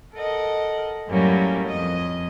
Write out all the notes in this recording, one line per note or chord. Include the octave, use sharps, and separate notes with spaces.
A4 A#4 D#5 F#5
F#2 A2 F#3 G3 A#3 C#4
F2 D#5